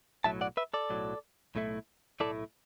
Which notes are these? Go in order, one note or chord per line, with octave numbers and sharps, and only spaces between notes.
B1 A2 F#3 E5 A5
D5 F#5
B4 E5
A4 D5
B1 A2 F#3
B1 A2 A3 E4
B1 A2 A3 E4 A4 D5